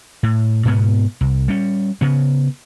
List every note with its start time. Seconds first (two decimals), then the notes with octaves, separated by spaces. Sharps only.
0.23 A2
0.65 G#2 B2 B3
1.21 C2
1.48 G3 C#4
2.01 C#3 B3